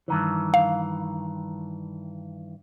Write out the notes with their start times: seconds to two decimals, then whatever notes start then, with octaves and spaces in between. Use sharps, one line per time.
0.08 G2 D#3 E3
0.54 F5